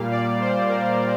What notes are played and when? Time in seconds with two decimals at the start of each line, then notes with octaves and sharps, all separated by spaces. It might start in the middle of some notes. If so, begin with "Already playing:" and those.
Already playing: A#2 G3 A#3 F5
0.12 D5
0.41 C5
0.69 A#4